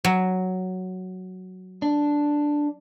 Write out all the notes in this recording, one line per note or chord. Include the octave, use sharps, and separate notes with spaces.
F#3
D4